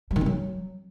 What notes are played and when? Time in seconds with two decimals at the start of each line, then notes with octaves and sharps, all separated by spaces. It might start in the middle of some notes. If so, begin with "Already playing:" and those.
0.11 G3
0.16 D#3
0.21 C4
0.26 F#3